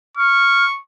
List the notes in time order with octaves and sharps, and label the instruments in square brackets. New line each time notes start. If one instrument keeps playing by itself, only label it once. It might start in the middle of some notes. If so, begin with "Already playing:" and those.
[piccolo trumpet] C#6 [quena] F6